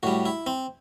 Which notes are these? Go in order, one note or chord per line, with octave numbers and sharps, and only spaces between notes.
A2 G3 F#4
E4
C4